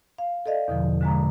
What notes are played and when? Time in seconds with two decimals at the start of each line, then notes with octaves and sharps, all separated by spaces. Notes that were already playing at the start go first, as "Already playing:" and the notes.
0.18 F5
0.46 A4 D5 D#5 F5
0.68 E2 B2 D3 F3
1.01 D3 G#3 A#5